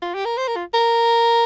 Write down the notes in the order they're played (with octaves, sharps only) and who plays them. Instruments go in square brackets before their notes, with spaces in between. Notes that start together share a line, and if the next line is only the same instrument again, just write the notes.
[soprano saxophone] F4
G4
A#4
C5
A#4
F4
A#4